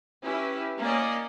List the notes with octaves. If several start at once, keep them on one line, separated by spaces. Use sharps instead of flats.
C#4 E4 G4 B4
A#3 C#4 D5 D#5